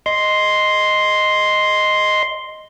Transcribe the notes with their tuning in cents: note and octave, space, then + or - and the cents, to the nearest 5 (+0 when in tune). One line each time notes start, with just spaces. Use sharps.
D#5 +0 C6 +0